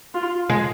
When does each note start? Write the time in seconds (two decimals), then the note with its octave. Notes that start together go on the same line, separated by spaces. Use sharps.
0.14 F4
0.50 G#3